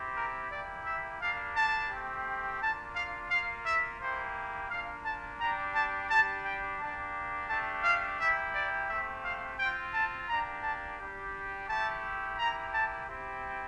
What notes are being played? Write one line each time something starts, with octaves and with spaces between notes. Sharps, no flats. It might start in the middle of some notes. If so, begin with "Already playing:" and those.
Already playing: C4 E4 G4
A#4
A#3 E4 G4 D5
E5
G3 A#3 D4 F5
A5
A3 C4 G4
A#3 D4 F4 A5
F5
A#3 F4 F5
E5
A#3 E4 G4 C5
A#3 D4 F4 F5
A5
G3 D4 G4 A#5
A5
G3 D4 G4 A5
G5
A#3 D4 G4 A5
A3 D4 G4 A5
F5
A#3 E4 G4 E5
D5
A3 C4 G4 E5
F5
C4 F4 G5
A5
A#3 D4 G4 A#5
A5
G3 D4 G4
A3 E4 G4 A5
A#3 E4 G4 A#5
A5
C4 E4 G4